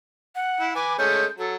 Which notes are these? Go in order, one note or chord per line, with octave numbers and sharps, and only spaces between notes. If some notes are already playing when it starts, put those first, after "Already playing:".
F#5
E4
B4 G#5 D6
G#3 A3 C#4 G6
F#3 A4